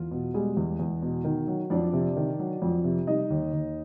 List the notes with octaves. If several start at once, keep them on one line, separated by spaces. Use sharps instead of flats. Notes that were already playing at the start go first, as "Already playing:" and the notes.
Already playing: E2 F4
B2
G3 G#3 G#4
E2
E2
B2
D#3
F#3
F2 D4 D5
C3
D#3
F#3
F2
C3
G3 D#4 D#5
D#2
D#2